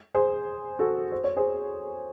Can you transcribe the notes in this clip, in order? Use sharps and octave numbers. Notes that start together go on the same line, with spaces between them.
G#4 C5
F#4 A4
C5
C#5
G#4 C5